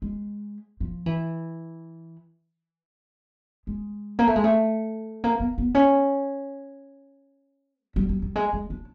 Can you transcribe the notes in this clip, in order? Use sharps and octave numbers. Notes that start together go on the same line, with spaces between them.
G#3
F3
E3
G#3
A#3
A3
G#3
A3
A#3
B3
B3
C#4
G3
G3
G3
G3
G#3
G#3
D4